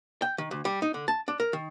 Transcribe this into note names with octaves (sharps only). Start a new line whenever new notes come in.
G5
D#3
D2
G3
D#4
D3
A5
D4
A#4
D#3